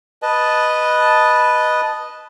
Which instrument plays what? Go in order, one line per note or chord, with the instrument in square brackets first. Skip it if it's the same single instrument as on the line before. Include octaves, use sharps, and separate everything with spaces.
[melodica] B4 D#5 A5